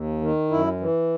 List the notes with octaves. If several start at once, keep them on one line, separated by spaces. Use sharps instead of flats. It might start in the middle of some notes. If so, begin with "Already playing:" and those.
Already playing: D#2
D#3
F#2 E4
E3